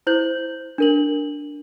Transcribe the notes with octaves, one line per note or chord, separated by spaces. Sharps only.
E4 C5 G6 F#7
D4 A#4 F#7